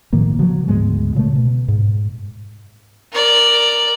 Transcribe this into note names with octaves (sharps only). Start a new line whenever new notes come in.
A2 D#3 F3 A#3
C#3 F3 F#3
D2 G#2 G#3 B3
A#2 C#3 G#3 A3
B2
G#2
A#4 D5